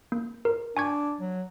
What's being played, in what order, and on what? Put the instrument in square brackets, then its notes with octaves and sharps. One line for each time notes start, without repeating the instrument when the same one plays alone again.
[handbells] A#3
A#4
[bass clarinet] D4 [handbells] G#5 C#6 G#6
[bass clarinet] F#3